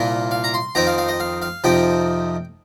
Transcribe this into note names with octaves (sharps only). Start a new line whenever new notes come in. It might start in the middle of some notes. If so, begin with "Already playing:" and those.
Already playing: C2 A#2 A#3 F4
F5
A#5
C6
F2 D#3 C4 D#4 A#5
F5
F5
D#5
F5
F5
F2 C3 F3 D#4 G5